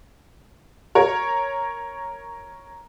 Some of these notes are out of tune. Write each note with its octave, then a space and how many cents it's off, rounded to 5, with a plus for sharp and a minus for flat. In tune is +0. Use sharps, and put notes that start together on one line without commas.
A#4 +0 C#5 +0